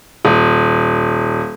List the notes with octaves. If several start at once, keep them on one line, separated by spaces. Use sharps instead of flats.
D#1